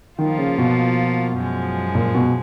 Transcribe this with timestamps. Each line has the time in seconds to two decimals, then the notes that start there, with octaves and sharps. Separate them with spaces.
0.19 D#3 F3 A#3 F4
0.38 C#3
0.58 B2
1.37 F#2 F3 G#3
1.95 A#2
2.15 B2